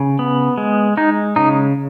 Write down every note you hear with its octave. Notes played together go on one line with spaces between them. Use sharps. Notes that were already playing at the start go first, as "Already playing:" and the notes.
Already playing: C#3
B3
G#3
G#3 D#4
C#3 D#4